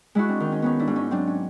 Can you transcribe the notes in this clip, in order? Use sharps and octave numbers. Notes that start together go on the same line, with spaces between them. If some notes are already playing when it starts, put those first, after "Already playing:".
G#3 E4 F#4
C4 D4
D#3
C#4 D#4
B3 C#4 D#4
D4 E4
G#2
C#4 D#4
F#3 C4 D4
C#4